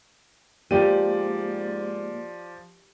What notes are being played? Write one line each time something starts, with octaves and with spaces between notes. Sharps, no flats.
G#2 F3 A#3 G4 D5 D#7